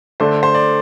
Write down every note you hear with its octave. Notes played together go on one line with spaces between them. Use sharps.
D3 A3 D4 C5
C5
D5